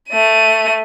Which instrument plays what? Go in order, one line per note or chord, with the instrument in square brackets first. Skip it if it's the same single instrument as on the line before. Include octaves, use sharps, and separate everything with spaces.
[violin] A3 D#7